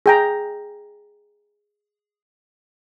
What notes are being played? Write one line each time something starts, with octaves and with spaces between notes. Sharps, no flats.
G#4 G5 A#5